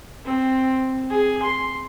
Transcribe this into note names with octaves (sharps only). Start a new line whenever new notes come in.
C4
G#4
C6